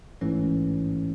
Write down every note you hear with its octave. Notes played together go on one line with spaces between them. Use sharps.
A1 G#2 E3 A3 C#4